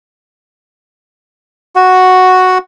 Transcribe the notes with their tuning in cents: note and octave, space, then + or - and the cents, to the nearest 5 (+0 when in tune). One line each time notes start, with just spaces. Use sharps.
F#4 +0 F#5 +0